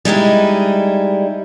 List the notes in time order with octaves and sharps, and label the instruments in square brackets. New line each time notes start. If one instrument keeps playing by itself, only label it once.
[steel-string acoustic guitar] G3 G#3 D#4 E4